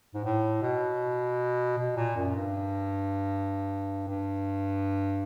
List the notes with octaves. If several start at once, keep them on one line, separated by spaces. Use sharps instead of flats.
G#2
A2
B2
B2
A#2
F#2
G2
G2